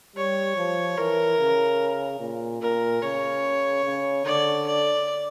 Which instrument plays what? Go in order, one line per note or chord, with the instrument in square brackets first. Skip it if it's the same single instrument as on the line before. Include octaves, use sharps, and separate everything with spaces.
[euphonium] G3 [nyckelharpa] C#5
[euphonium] F3
[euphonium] E3 [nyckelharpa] A#4
[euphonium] C#3
A#2
[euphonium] A#2 [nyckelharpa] A#4
[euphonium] C#3 [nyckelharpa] C#5
[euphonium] C#3
[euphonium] D3 [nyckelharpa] D5
[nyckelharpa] D5